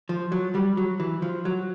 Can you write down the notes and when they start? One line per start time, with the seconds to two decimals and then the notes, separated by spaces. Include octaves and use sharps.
0.09 F3
0.32 F#3
0.55 G3
0.77 F#3
1.00 E3
1.22 F3
1.45 F#3